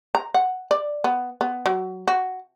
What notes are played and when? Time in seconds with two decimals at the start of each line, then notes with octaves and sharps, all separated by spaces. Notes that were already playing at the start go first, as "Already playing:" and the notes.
0.15 A#5
0.34 F#5
0.71 D5
1.04 B3
1.41 B3
1.66 F#3
2.08 F#4